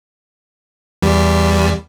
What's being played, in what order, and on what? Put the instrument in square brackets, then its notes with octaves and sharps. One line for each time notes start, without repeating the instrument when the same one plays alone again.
[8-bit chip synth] E2 G3